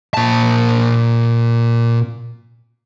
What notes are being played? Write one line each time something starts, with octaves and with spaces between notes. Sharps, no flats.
A#2 A5